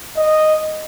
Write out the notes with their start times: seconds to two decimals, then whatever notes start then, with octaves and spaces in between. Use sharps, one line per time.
0.16 D#5